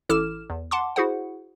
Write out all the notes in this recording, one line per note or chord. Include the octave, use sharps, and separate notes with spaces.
A1 E4 A4 D6 F6 E7
E2
F#5 A5 C6 D6
E4 F#4 G#4 C5 F#5